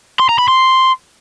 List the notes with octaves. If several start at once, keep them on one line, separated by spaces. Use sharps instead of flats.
C6
A#5
B5
C6